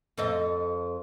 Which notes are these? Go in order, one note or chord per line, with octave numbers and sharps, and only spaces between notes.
F2 A4 D#5